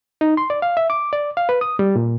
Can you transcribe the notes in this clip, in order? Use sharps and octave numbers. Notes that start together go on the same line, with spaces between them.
D#4
C6
D5
F5
E5
D6
D5
F5
B4
D#6
G3
A#2